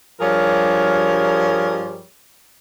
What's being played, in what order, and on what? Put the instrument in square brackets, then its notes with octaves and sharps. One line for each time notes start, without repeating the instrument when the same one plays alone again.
[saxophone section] G2 F3 G3 G#4 A#4 C#5